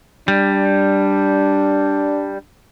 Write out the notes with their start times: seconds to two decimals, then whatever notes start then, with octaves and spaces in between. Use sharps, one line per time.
0.28 G3 D4